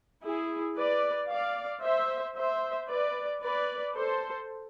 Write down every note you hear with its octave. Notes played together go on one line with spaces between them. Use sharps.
E4 G#4
B4 D5
D5 F5
C5 E5
C5 E5
B4 D5
B4 D5
A4 C5